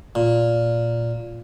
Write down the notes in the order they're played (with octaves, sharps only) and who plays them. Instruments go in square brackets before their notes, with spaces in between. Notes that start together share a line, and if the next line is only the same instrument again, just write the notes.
[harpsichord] A#2